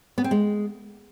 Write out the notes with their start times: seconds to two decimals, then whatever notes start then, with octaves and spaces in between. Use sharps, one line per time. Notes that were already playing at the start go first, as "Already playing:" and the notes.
0.18 B3
0.24 C4
0.31 G#3